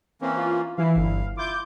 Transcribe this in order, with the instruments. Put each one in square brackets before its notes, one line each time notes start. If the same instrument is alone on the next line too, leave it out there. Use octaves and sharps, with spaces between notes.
[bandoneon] E3 A#3 C#4 [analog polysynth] C4
[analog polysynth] F4
[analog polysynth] E3 E4 [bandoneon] F5
[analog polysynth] G1
[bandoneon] E4 F4 [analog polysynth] D6 G6